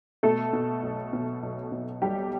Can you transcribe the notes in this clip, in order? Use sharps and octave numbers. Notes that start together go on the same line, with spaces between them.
B2 A3 A4
B2
B1
B2
B1
B2
B1 G3 G4